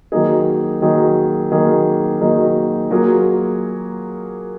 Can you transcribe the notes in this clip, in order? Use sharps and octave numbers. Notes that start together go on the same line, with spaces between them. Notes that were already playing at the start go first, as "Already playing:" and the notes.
D#3 F#3 A#3 D#4 G#4
D#3 F#3 A#3 D#4 G#4
D#3 F#3 A#3 D#4 G#4
D#3 F#3 A#3 D#4 G#4
F#3 A#3 F4 G#4